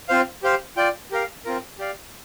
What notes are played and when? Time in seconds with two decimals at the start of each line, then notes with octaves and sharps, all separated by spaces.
0.09 C4 F4 C5 F5
0.43 G4 C5 F5
0.77 F4 D5 G5
1.11 G4 A#4 F5
1.45 C4 F4 A#4
1.79 G4 D5 F5